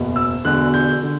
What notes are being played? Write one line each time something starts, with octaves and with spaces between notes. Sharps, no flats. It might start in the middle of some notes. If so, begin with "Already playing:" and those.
Already playing: F#1 E2 B2
E6
E1 E2 D3 F#6
G6
D3